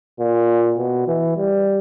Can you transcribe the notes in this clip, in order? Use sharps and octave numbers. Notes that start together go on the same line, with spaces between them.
A#2
B2
E3
G3